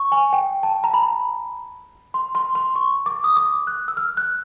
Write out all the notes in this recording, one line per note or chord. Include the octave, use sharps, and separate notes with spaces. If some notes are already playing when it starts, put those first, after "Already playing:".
Already playing: C#6
G#5
G5
A5
A#5
B5
C6
C6
C6
C#6
D6
D#6
D6
F#6
E6
F6
F#6